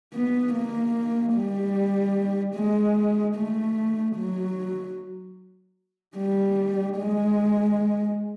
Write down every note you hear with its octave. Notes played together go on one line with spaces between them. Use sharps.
B3
A#3
G3
G#3
A3
F#3
G3
G#3